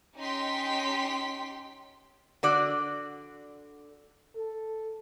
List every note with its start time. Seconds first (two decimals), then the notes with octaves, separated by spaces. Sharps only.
0.17 C#4 D#4 G4 G5 C6 B6
2.43 D3 F#4 D5
4.36 A4